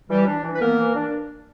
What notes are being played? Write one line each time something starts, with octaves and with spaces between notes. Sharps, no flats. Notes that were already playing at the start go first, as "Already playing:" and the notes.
E3 G3 G4
D4
E3
B4
A#3 B3 A#4
E3
D4